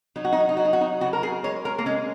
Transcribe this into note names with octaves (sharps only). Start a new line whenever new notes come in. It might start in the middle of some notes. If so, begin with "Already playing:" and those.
F#3 D#4
F#4
D#4
F#4
D#4
F#3 F#4
D#4
F#4
D#4
C#3 F#4
A#4
G#4
G#3 C#5
A#4
A#3
G#3 C#4